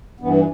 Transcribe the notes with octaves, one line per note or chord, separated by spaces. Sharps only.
G2 E3 B3